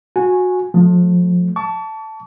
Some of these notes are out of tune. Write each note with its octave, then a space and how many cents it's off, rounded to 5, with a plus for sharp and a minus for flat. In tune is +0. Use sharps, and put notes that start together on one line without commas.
F#4 -20 G#5 +0
F3 +30 A3 -30
A5 +0 C#6 +45